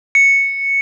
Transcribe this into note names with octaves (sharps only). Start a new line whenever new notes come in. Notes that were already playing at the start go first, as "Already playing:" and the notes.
C#7